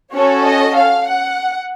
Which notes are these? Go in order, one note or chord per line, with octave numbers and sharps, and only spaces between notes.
C#4 F#4 A4 C#5
D#5
F5
F#5